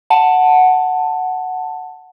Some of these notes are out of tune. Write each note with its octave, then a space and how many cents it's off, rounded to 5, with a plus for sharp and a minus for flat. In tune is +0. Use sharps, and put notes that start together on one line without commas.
F#5 +0 A5 +10